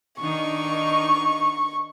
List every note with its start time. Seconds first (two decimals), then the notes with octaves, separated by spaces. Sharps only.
0.19 D#3 D4 D#4 C#6